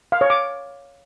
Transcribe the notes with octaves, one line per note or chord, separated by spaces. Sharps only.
F5
C#5
D6